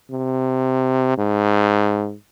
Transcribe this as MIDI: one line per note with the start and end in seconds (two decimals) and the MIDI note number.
0.11 1.16 48
1.17 2.14 44